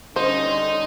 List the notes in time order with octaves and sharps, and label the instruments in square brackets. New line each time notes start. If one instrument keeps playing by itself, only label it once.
[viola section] D3 G3 C#4 [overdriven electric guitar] D#4 [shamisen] C5 [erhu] C6